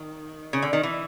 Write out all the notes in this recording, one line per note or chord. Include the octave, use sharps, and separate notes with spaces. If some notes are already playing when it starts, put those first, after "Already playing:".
Already playing: D#3
C#3
D3
D#3
E3